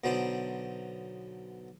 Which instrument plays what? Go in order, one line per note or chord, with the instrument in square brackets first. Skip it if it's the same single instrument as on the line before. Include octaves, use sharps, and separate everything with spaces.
[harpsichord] B1 D3 F#3 B3 C5 D5